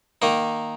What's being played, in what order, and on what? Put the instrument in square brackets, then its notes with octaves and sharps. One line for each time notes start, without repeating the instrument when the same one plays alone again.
[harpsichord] D#3 A#3 D#4